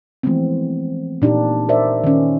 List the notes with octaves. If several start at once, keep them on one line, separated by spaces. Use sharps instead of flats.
E3 F3 G#3 A3 B3 C4
A#2 D4 D#4 G4
A#4 C5 D5 E5
D#3 C#4